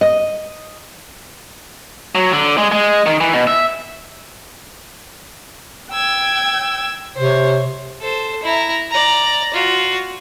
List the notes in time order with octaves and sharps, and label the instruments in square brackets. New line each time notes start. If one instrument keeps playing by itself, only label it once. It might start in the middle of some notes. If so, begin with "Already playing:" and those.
[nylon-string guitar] D#5
[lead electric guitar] F#3
D3
G#3
G#3
D#3
E3
B2
E5
[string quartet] G5 E6 G#6
[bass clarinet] C3 [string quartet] C5 C#5
[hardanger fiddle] A4 C5
E4 A#5
D5 A#5
F4 F#4